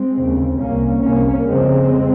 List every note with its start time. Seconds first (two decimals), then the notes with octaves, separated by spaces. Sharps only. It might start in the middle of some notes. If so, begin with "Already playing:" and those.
Already playing: G#3 C4
0.16 D#2 C#3
0.60 C2 C3 A#3 C#4
1.04 C2 C3 A#3 C#4
1.47 F2 C#3 G#3 C4